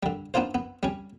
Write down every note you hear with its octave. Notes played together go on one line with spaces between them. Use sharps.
D3 G3
B3 D4 D#4 F4 C5
B3
G3 C#4